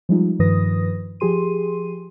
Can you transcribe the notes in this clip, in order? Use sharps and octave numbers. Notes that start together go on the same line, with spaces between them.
F3 G3 G#3 D#4 F4
G2 D#3 F3 B4 D#6 A#6
F3 G4 G#4 C6 D#7